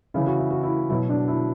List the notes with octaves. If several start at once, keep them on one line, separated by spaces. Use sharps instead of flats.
C#3 E3 E4
F#4
E4
F#4
E4
B2 F#3 E4
D4
E4